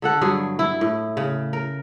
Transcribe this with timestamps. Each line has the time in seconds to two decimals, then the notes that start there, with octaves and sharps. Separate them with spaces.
0.02 D3 A4 F#5
0.21 G2 F#3 G#4
0.59 E4
0.81 A2
1.17 C#3
1.53 A#4